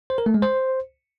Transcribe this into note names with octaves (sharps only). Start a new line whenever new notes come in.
C5
A#4
A3
G#3
C5